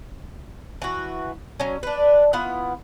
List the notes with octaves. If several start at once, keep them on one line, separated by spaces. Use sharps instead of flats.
E3 F#4
F#3 C#4
D4 B4
B3 E4 F4 F#5